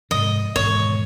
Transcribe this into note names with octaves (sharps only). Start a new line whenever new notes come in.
G#2 C3 F3 D#5
E1 G#2 D#3 C#5